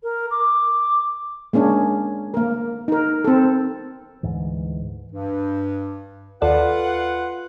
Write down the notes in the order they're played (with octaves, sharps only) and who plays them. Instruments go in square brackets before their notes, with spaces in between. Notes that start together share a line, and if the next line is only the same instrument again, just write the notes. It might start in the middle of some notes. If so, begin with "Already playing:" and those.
[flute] A#4
D6
[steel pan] G#3 A#3 C#4 D4
A#3 A#4
D#4 A#4
C4 A4
[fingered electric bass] D2 G#2 E3
[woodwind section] G2
[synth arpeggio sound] D#2 A4 D5 [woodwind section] F4 B4 F#5